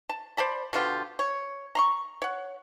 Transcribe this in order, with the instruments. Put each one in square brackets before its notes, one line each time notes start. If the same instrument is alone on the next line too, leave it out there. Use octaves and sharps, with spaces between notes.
[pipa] A5
C5 D5 A5 B5
B2 D3 F4 G4
C#5
A#5 C6 C#6
C#5 F#5